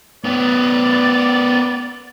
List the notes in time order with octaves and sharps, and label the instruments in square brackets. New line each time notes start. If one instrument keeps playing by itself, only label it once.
[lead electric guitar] B3 C#4 [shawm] D5